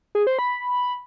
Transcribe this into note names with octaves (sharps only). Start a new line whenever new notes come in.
G#4
C5
B5